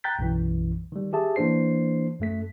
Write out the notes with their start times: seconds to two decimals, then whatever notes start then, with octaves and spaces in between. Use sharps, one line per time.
0.04 G5 A#5 F#6 G6 A6 B6
0.19 B1 F#2 E3
0.92 D#3 G3
1.13 G4 G#4 E5 A5
1.36 E3 A#3 D4 C5 C7
2.20 F#2 A3 B6